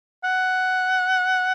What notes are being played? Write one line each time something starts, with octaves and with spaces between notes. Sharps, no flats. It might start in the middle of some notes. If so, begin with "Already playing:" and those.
F#5